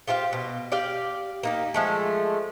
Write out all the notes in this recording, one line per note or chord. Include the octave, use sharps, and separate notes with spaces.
F4 G4 C5 F5
B2
G4 D5 F5 G5
A#3 D#4 G4
F3 G#3 A3